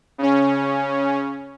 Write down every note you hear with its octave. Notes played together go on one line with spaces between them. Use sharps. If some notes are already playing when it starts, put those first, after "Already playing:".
C#3 C#4